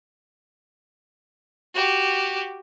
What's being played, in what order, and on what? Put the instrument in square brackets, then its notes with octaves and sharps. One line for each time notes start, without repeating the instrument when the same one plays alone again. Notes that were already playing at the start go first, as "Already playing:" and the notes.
[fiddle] F#4 G4